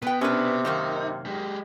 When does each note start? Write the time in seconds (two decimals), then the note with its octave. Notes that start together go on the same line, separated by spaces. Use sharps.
0.02 B2 B3 B4 G5
0.21 C3 C#4 D4 B4
0.65 F#2 D#3 A#3 D#4
1.26 G#3 G4